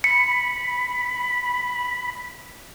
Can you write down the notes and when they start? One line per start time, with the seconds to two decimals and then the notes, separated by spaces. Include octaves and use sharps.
0.04 B5 C#7